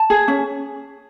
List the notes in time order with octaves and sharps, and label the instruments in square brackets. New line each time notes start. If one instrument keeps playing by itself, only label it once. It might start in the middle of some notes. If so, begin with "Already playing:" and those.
Already playing: [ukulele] A5
G#4
C#4